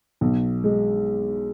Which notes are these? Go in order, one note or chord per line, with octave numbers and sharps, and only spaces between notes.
B1
G#3